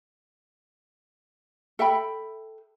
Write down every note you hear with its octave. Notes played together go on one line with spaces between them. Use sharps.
A4 E5 G5 B5